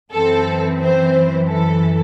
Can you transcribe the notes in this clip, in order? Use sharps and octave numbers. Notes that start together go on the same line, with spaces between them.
F#2 E3 C4 A4
C4 C5
A4